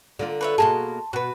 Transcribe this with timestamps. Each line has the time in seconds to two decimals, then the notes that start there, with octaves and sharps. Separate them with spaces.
0.19 D3 A#3 F4
0.41 B4 C#5 E5
0.58 B2 A#3 G#4 A5 A#5 C6
1.13 B2 F#4 B4